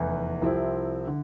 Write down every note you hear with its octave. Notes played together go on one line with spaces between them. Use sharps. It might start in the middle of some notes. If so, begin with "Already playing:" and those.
Already playing: F1 E2 E3
C2 C3 F3 C4 E4
D3